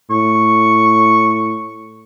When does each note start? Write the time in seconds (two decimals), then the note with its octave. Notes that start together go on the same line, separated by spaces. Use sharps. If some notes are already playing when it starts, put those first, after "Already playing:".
0.10 A2 C#6